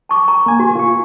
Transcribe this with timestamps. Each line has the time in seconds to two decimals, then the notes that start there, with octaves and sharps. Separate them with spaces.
0.09 A5 C#6 D6
0.28 A#5
0.46 A#3 G#5
0.60 F#4
0.75 F4 C#6